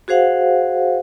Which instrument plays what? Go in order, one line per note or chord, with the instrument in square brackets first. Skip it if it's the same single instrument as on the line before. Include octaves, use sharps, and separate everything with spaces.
[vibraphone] F#4 G#4 C5 F5 F#5